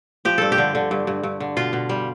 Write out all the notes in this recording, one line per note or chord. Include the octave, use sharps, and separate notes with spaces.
F3 G4
G2 A4
G4
D3
D3
G2
G2
G2
D3
B2 F4
B2
G3